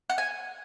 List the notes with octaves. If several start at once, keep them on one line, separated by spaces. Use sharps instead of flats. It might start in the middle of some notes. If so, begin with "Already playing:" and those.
F#5
G#5